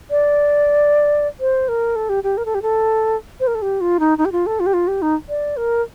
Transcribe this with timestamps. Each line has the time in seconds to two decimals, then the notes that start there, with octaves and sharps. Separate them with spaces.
0.11 D5
1.40 C5
1.69 A#4
1.96 A4
2.09 G4
2.24 G4
2.37 A#4
2.45 A4
2.55 G4
2.62 A4
3.40 C5
3.47 A#4
3.55 A4
3.62 G4
3.81 F4
4.00 D#4
4.18 D#4
4.25 G4
4.32 F4
4.46 A4
4.60 F4
4.66 G4
4.74 F4
4.88 G4
5.02 D#4
5.29 D5
5.57 A#4